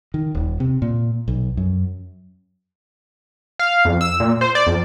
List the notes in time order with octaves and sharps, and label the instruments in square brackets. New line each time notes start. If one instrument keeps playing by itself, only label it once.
[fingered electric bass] D#3
D#1
C3
A#2
B1
F#2
[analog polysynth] F5
F2
E6
A#2
C5
D5
F2